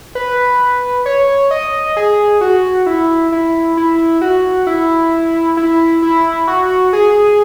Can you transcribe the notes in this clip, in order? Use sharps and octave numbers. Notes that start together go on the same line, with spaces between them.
B4
C#5
D#5
G#4
F#4
E4
E4
E4
F#4
E4
E4
E4
F#4
G#4